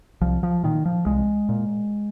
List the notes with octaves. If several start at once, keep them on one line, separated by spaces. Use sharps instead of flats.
C2 F3
F3
A#2 D#3
F3
C2 G#3
A#2